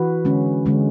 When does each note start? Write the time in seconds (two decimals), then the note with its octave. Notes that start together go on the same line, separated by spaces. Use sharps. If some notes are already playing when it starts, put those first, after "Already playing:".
Already playing: E3 F#4 B4
0.25 D3 G#3 C#4
0.66 D3 G#3 C#4